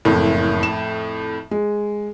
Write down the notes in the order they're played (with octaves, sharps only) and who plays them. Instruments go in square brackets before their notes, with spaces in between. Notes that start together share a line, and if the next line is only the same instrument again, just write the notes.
[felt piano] F#1 [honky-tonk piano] F2 A2
[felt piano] E7
G#3